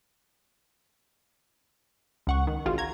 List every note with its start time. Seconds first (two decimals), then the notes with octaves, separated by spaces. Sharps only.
2.27 C#2 F#5 C#6
2.47 D#3
2.66 A1 C#3 F4 F#4
2.78 A#5 G#6